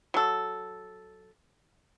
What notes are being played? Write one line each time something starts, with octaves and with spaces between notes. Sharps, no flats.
F#3 A4